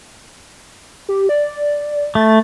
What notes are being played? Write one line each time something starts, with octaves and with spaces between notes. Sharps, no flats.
G4
D5
A3 A6